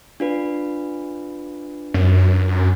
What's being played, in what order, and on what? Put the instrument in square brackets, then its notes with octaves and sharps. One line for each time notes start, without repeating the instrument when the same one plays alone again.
[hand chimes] D4 F4 B4
[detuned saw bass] F#2